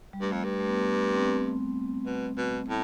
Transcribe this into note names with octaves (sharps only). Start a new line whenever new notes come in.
G3
G2 A3
F2
G2
A3
B3
C4
B2
B2
A2